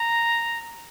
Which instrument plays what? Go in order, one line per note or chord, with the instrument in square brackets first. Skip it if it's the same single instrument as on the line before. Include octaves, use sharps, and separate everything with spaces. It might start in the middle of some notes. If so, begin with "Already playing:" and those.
Already playing: [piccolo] A#5